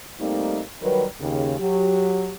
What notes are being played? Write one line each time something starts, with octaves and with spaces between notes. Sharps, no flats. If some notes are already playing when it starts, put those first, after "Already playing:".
G3 A3 A#3 C4 D#4
D#3 F#3 G3 A#4 B4
D#2 C#3
F#3 G4